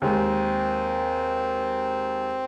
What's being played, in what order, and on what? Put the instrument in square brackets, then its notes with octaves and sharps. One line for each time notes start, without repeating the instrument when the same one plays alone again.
[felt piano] D#2 G#3 [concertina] C4